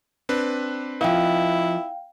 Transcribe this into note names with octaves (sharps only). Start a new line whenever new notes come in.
C4 D4 B4
F3 E4 D#5 F5 G5